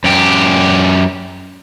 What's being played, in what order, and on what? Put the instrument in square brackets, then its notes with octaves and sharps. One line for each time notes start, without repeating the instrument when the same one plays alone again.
[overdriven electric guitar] F#2 G4